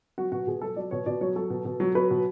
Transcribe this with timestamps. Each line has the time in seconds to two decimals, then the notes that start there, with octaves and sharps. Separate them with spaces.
0.18 F#3 F#4
0.32 B2 F#4
0.47 B2 G#4
0.61 F#3 A4
0.76 F#3 D5
0.91 B2 C#5
1.06 B2 D5
1.21 F#3 C#5
1.36 F#3 A4
1.50 B2
1.65 B2
1.80 F#3
1.95 F#3 B4
2.11 B2